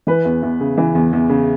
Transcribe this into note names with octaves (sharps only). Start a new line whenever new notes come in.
E3 B4
E2
E2
C#3
E3
E2
E2
C#3